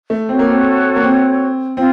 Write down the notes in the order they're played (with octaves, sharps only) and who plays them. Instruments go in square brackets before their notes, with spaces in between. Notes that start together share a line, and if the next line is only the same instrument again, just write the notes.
[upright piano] A3
[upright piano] C4 [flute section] F#4 A4 C#5
[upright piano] A#3
C4
A#3
C4
[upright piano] C4 [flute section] F4